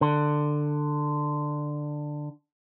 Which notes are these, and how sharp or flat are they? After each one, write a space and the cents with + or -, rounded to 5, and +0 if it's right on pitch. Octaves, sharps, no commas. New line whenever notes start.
D3 +15